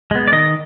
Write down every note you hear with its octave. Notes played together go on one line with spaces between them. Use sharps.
G#3 B3
D5
D#3 D#5